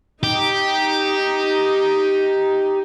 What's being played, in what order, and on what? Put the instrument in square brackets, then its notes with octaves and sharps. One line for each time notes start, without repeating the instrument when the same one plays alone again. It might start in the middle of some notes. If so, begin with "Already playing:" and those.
[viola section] D#4 [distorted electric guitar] G4